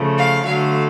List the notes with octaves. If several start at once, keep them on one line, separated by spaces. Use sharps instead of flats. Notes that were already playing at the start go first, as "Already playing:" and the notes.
Already playing: C#3 F3 A3
F5
D3 F#3 A3 F5